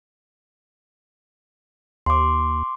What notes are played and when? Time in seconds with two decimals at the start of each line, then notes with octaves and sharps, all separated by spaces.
2.06 D#2 C6 D6